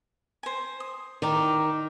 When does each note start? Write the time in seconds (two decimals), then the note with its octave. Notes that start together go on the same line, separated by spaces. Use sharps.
0.43 C5 G#5
0.80 D#6
1.22 D#3 D5 A#5 D6